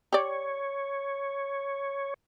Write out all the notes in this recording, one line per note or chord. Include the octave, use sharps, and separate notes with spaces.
G4 C#5 D5